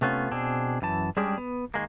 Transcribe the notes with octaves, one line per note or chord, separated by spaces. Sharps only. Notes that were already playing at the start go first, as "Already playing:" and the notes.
C3 A3 B3 C#4 F4
B2 C4 D4 G#4
F#2 E3 A5
G3 G#3 C#4 D4 G4 G#4
B3
D#3 E3 G#3 A#3